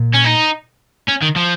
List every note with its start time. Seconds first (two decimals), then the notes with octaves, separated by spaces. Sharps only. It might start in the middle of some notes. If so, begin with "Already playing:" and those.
Already playing: A#2
0.14 C#4
0.25 D#4
1.08 C#4
1.22 D#3
1.36 F3